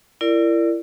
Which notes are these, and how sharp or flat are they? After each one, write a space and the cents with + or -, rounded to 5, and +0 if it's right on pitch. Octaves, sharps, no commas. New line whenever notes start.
E4 +35 A#4 -20 D5 +0